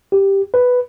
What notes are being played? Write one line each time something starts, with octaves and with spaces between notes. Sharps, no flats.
G4
B4